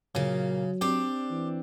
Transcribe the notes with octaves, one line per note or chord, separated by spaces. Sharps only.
A#2 C#3 F#3 A#3
C4 D4 G4
E3